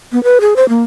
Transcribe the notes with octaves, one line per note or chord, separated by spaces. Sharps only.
B3
B4
G#4
C5
A#3